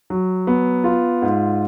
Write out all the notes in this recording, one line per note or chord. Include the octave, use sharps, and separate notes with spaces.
F#3
B3
F4
G#2